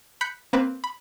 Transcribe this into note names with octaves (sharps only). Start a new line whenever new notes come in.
B5 F#6 G6 B6 C#7
A#3 C4 B4
B5